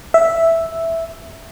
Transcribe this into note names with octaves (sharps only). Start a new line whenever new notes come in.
E5